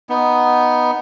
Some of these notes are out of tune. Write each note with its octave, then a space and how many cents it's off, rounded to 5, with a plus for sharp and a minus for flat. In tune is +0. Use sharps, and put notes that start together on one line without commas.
B3 +0 D#4 +0